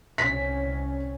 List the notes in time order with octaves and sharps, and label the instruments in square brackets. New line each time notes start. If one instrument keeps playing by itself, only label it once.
[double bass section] C2 C#4 [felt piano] B6